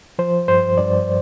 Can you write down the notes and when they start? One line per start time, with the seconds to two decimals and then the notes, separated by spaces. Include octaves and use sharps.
0.19 F3 C5
0.48 G2 C5
0.77 G2 D5